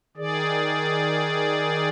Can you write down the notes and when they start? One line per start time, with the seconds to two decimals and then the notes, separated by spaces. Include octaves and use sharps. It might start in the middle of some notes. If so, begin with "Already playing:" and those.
0.17 D#3 G#4 D5